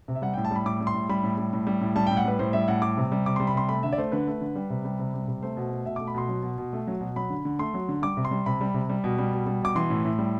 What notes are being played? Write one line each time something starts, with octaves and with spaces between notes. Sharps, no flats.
C3
E5
G3 F#5
A2 G5
A5
G3 B5
A2 D6
G3
C6
A2
G3 B5
A2
G3
A2
G3
A2
G3 A5
A2 G5
F#5
G3 B4
A2 C5
G3 E5
A2 F#5
G3 D6
C3
G3
C3 D6
G3 C6
B5
C3 C6
A3 B5
D3 E5
D5
A3 C5
D3 B4
A3
D3
G3
C3
G3
C3
G3
C3
A3 C5
B2
A3
B2 E5
A3 D6
B5
B2 C6
F#3
B2
B2
A3
F#3
B2
F#3 B5
D3
D3
A3 C6
F#3
D3
G3 D6
C3
C6
G3
C3 B5
G3
C3
G3
B2
G3
B2
G3
B2 D6
E3 C6
A2
A2
G3